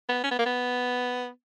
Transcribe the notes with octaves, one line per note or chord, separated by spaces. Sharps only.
B3
C#4
B3
A#3
B3